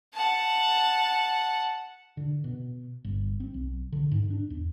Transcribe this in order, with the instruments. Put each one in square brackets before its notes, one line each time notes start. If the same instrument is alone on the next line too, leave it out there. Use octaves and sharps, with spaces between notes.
[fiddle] F#5 A5
[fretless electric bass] D3
B2
G1
C4
B1
D3
G#2
D4
E2